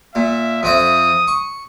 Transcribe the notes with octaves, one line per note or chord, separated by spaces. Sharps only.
A#2 E5
F2 C4 E5 D#6
C#6